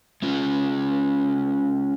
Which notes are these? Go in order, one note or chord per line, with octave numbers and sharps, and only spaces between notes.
G#3 C#4 F4